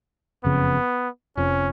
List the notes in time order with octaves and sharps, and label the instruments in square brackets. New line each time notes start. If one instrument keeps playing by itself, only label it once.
[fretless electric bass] F#1 F2 C#3 [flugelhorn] B3
[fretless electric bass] F1 F2 F3 [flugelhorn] C#4